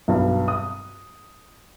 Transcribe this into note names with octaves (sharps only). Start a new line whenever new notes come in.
B1 G2
D#6